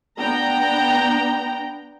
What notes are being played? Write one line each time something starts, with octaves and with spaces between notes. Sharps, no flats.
B3 D4 G5 A#5